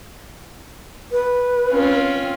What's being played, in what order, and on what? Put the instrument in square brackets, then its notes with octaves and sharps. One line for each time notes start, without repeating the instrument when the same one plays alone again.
[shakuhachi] B4
[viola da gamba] C4 C#4 F4